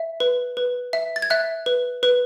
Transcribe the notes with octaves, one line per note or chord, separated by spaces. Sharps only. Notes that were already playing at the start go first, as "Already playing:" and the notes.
Already playing: E5
B4
B4
E5
A6
G#6
E5 F#6
B4
B4